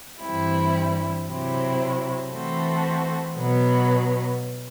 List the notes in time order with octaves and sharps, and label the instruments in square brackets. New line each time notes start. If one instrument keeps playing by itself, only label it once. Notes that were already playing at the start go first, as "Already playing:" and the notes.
[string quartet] G2 E3 G3 C4 E4
C3 F#3 C4 E4
E3 A3 C4 F#4 A4
B2 F#3 B3